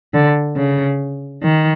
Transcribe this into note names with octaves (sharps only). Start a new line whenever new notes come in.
D3
C#3
D#3